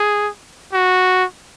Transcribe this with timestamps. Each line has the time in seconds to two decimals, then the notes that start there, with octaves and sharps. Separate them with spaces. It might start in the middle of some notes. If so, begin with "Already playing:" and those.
Already playing: G#4
0.73 F#4